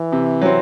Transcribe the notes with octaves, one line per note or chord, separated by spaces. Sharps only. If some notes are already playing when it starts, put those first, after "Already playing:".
Already playing: E3
C3
F#3 C4